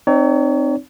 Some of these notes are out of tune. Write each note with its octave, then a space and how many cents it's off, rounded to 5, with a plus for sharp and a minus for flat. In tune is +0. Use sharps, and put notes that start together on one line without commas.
C4 +0 D#4 -30 C#5 +35